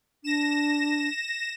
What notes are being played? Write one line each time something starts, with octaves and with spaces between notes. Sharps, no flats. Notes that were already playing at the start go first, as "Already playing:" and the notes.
D4 A#6 E7